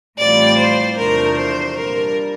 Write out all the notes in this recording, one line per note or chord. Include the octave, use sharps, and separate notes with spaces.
A2 E3 G3 C4 F4 D5
C5
E2 C3 F3 A3 D4 A#4
C5
A#2 G3 A#3 D4 A#4